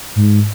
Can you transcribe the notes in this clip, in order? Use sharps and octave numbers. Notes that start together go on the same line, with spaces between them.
G#2